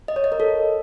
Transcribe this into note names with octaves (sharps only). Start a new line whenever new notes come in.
D#5
C#5
D#5
A#4
A4